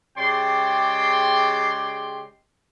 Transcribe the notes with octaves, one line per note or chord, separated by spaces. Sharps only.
C#3 G#3 G4 D5 G5 C6